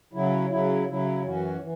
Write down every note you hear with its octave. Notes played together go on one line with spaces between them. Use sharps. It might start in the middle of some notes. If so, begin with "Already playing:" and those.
C#3 F#3 E4
C#3 F#3 E4
C#3 F#3 E4
F#2 E3 C#4 F#4
E3